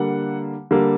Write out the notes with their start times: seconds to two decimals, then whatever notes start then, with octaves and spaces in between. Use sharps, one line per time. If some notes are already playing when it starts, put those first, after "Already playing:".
Already playing: D3 G3 A#3 F#5
0.71 D3 G3 A#3